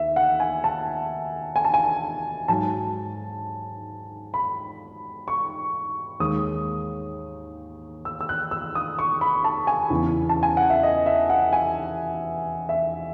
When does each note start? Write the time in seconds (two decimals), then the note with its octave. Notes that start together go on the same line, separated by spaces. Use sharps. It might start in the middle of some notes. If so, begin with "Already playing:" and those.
Already playing: D#2 E5
0.16 F#5
0.40 G#5
0.64 A5
1.56 G#5
1.65 A5
1.74 G#5
2.48 G#2 F#3 A5
4.34 B5
5.28 C#6
6.20 D#2 D#3 G#3 D#6
8.05 E6
8.21 E6
8.29 F#6
8.51 E6
8.75 D#6
8.99 C#6
9.21 B5
9.44 A5
9.67 G#5
9.90 E2 C#3 E3
10.29 A5
10.43 G#5
10.57 F#5
10.70 E5
10.83 D#5
11.06 E5
11.30 F#5
11.53 G#5
12.69 E5